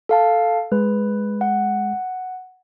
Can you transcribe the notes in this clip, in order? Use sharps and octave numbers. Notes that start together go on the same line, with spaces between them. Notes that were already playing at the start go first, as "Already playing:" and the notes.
A4 F5 A5
G#3 B4
F#5